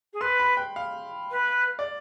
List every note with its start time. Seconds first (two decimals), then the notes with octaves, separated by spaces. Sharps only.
0.13 G#4
0.21 B4 C6
0.40 B5
0.57 G5
0.76 F5
1.30 B4
1.79 D5